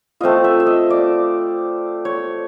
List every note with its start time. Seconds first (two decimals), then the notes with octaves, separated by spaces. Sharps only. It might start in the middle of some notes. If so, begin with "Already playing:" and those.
0.21 A3 C4 F4 D#5
0.44 E5
0.60 E5
0.66 D#5
0.90 D5
2.05 C#5